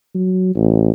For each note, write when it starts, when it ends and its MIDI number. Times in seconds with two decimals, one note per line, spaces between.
0.15 0.53 54
0.55 0.91 33